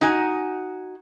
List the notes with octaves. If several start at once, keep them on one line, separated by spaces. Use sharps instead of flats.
D#4 F#4 G#5